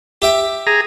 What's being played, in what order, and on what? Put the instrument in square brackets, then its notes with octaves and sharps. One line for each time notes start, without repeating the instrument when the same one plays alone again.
[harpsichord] G4 E5 G5
[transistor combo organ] G#4 A#5